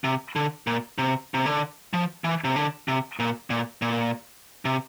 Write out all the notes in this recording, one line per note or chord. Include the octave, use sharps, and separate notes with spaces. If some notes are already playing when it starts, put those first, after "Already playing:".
C3
D3
A#2
C3
C3
D3
F3
E3
C3
D3
C3
A#2
A#2
A#2
C3